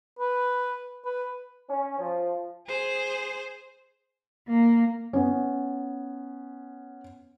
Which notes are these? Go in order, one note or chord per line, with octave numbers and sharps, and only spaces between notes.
B4
B4
C#4
F3
G#4 C5
A#3
B3 C#4